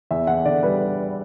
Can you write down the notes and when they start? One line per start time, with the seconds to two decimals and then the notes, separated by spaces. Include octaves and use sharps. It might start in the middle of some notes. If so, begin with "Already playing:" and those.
0.11 E2 E5
0.27 E2 F#5
0.45 D3 D5
0.63 G3 B4